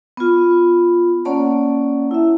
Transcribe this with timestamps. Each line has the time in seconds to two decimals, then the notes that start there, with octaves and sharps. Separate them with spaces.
0.17 B3 F4
1.25 A#3 C#4 C#5 D5 F#5 A5
2.11 E4 E5